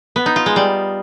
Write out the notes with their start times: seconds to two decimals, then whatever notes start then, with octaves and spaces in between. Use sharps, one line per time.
0.16 B3
0.26 D#4
0.36 F4
0.46 G#3
0.56 G3